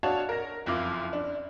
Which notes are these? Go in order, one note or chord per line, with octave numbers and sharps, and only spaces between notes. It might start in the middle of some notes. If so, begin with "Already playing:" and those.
D4 F#4 C#5 D#5 F5 A5
A#4 A#6
F#1 F2 E4 F4 D6
D4